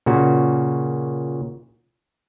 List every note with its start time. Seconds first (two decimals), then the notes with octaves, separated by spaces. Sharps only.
0.06 A#2 C#3 F#4